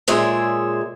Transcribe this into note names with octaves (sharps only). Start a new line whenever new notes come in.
A#2 G#3 G#4 C#5 E5